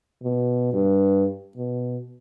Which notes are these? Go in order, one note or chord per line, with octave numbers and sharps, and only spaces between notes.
B2
G2
B2